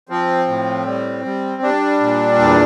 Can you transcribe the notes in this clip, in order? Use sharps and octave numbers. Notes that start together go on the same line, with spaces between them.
F3 C4
A2
G3
G3
G3 D4
A#2
E2